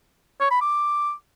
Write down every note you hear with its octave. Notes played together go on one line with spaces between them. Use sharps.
C#5
B5
D6